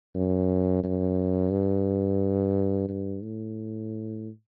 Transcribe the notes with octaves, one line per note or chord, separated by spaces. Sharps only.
F#2
F#2
G2
G2
A2